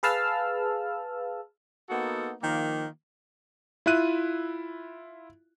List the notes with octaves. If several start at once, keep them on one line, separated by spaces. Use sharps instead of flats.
G#4 B4 F5 A5 E6 F6
A#3 B3 D#4 F#4 A4
D#3 F3 A#3
E4 F4 E5 F#6 D#7